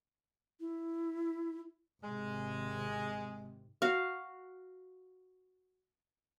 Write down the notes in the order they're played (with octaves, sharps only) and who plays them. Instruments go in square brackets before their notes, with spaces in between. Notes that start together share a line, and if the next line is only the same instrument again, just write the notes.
[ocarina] E4
[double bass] G#1 C3 [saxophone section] G#3
[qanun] F#4 F5